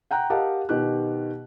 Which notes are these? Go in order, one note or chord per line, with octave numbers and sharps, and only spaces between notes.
F#5 G5 A#5 F#6
G4 A#4 D#5 F5 F#5 A5
B2 D#3 G4 F#6